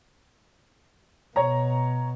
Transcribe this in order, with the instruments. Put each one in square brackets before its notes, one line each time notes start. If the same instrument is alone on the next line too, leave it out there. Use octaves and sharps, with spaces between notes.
[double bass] B2 [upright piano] C#5 A#5